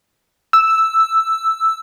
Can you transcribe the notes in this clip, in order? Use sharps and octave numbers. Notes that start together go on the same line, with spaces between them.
E6